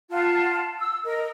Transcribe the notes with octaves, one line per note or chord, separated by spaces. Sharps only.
F4 F#5 A5
E6
A#4 D#5